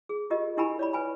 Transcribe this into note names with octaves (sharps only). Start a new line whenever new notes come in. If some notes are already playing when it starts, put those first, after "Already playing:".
G#4
F4 G4 A#4 D#5
D4 E4 G4 A#4 G#5 B5
C#5 D5 B5
B4 G#5 B5